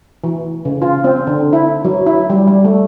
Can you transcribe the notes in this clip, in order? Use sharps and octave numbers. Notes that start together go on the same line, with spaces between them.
E3
C#3
F4
C4
D3
E4
F#3
E4
G3
G3
A3